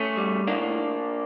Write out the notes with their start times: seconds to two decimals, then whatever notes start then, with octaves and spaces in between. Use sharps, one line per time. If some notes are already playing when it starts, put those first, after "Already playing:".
Already playing: A3 C#4
0.17 G3
0.47 A2 A#3 D4